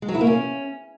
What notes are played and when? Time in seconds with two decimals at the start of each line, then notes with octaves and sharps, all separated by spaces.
0.02 G#3
0.08 F#3
0.15 E4
0.21 A#3
0.27 C#4